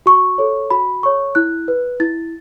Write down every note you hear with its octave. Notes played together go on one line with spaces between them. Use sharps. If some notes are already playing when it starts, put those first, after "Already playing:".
F#4 C#6
A4 C#5
F#4 B5
A4 C#5 C#6
E4 F#6
B4
E4 A6